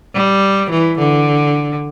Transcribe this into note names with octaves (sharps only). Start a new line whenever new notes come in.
G3
E3
D3